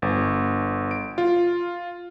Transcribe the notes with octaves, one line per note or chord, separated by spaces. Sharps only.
G1
D7
F4